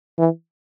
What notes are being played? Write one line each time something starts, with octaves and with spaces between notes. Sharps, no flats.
E3